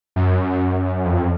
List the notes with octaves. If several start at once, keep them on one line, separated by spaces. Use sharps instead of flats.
F#2
F2